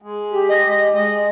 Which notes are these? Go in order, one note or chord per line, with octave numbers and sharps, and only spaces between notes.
G#3
G4
D#5
G#3
G#3 D#5